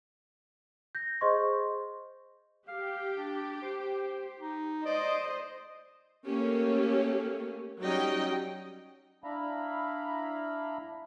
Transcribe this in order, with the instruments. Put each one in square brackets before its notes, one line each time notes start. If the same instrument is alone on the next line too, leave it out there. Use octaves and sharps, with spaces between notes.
[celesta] G6 A#6
G#4 C5 D#5 C6 C#6
[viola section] G4 [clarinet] F5
[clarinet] D4
C5
D#4
[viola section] C5 D#5 [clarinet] D5
[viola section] A3 A#3 C#4 G4
F#3 G3 C#4 D#4 D#5 G5
[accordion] D4 E4 E5 F5 A#5 B5